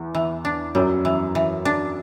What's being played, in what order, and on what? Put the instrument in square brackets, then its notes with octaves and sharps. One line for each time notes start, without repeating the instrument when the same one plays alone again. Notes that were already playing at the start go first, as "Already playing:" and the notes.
Already playing: [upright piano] E2
[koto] E3
D4
[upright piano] F#2 F#3 [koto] G3
[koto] E3
E3
D4